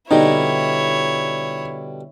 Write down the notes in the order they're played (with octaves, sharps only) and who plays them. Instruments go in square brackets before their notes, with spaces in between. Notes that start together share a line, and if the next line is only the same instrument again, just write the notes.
[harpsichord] B2 D3 G3 [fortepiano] D#4 [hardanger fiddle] E4 C#5